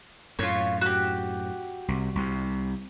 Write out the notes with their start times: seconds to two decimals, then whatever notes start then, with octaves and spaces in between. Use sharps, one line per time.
0.39 F#2 A2 F4 C#5
0.81 F#4 G4
1.88 C2
2.15 C2 C3